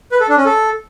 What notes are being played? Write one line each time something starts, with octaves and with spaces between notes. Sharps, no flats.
B4
A4
D4
C#4
A4